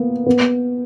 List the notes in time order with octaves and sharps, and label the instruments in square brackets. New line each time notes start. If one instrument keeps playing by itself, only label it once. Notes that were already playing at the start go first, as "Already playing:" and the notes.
Already playing: [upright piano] A#3 B3
B3